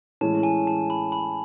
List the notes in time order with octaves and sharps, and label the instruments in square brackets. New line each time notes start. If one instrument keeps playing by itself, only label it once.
[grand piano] A2 E3 G#3 C#4 [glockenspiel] A5
[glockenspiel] G#5
A5
B5
B5